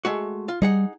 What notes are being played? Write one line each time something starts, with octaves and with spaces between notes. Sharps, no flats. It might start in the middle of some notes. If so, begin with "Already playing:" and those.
G#3 A3 F#4
F4
G3 D#4 G#4 F#5